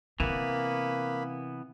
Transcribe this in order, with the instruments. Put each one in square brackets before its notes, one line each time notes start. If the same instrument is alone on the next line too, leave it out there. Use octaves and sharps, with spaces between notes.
[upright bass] C3 [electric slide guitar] E3 B3 [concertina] A#3 B5